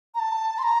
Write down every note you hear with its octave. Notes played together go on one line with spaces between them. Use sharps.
A#5
A5
C6
A#5